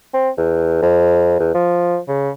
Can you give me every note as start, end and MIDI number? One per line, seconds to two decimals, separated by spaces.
0.14 0.29 60
0.37 0.80 40
0.82 1.37 41
1.40 1.53 40
1.54 1.98 53
2.08 2.30 49